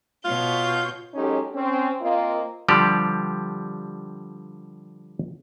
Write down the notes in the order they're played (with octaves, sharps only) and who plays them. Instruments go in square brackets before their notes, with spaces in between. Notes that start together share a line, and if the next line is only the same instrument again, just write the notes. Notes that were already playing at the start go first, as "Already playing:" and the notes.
[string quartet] B2 C#5 G6 [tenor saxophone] F4
[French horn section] F#3 G#3 C#4 D#4 G4 A4
C4 C#4
A#3 C4 F4 A#4 D#5
[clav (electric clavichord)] D3 F3 G3 G4 D5